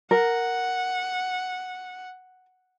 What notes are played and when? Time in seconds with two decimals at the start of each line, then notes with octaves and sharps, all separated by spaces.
0.11 A#4 F#5